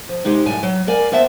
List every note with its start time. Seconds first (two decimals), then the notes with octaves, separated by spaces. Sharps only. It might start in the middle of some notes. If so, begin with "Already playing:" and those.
0.09 F3
0.24 C3 G#3 D#4 G4
0.46 F#2 A2 G3 G#5 A5
0.63 F#3
0.87 A#4 D5 F5 G#5
1.12 A#3 B3 C5 E5 G#5 A5